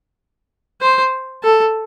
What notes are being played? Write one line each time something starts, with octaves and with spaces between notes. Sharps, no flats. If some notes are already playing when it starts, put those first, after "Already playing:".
C5
A4